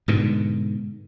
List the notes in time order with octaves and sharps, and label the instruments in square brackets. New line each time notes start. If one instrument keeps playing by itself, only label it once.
[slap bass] G#2 B2 D3